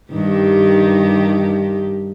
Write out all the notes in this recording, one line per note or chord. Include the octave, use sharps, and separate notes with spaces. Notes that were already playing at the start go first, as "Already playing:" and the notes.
G2 D#3 G4